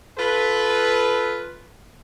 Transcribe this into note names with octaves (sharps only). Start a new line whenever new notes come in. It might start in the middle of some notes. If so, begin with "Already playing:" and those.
F4 A4 B4